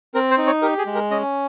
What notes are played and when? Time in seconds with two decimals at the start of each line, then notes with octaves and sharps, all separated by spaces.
0.14 C4 A#4
0.31 C5
0.38 D#4
0.46 C#5
0.62 G4 A#4
0.78 G#4
0.86 G#3
0.95 A#4
1.11 C#4 D#5